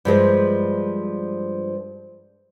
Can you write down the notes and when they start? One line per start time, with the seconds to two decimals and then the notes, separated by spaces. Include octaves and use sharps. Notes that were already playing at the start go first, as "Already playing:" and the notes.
0.05 G2 F3 G#3